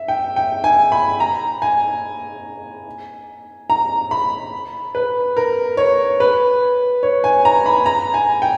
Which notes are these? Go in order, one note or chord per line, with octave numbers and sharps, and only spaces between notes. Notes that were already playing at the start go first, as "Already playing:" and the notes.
Already playing: E5
G5
G5
G#5
B5
A#5
G#5
A#5
B5
B4
A#4
C#5
B4
C#5
G#5
A#5
B5
A#5
G#5
G5